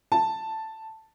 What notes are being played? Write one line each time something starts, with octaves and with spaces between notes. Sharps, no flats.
A5